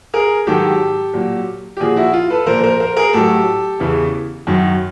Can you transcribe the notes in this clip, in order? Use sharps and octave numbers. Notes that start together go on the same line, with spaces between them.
G#4 A#4
G#2 D#3 F#3 G4 A4
A#2 F#3
G4
A#2 F3 F#4 G#4
E4 F#4
F4
A4 B4
A#2 F3 A#4 C5
A#4 C5
A#4 C5
G#4 A#4
A2 F#3 G4 A4
E2 C#3 E3
F#2 D#3 F#3